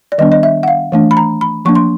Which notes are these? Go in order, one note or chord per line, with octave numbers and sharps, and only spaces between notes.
D5
D#3 G3 B3 D4 D#5
D#5
E5
F#5
F5
E3 A3 D4
B5
A#5
B5
F3 A#3 D4 C#6
C6